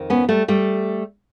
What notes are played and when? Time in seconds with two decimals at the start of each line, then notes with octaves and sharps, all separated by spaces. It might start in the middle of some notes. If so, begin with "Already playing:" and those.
Already playing: F2 D#3
0.10 B3 C#4
0.29 G3 A3
0.48 G3 A3